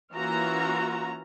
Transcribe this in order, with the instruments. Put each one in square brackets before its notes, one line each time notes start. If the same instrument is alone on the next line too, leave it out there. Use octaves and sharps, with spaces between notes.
[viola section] E3 A#3 C#4 F4 F#4 A#5